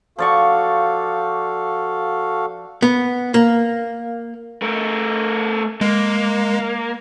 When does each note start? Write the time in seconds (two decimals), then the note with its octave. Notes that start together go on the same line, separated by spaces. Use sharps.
0.19 F3 F#4 A4 D5 F5 C#6
2.82 B3
3.34 A#3
4.62 A3 A#4
5.81 G#3 A#3